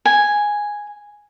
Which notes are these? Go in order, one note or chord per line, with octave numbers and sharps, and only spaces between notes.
G#5